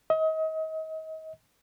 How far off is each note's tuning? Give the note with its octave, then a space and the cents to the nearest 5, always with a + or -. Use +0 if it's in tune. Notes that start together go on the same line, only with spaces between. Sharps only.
D#5 +35